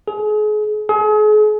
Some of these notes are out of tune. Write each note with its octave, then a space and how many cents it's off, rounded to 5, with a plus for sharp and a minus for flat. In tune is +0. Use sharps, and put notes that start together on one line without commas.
G#4 +35
G#4 +40